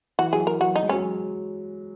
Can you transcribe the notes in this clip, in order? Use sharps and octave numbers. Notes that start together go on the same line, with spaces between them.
E3 F#4
F#3 G#4
A#4
F#3 F#4
D#4
G#3
F#3 C#4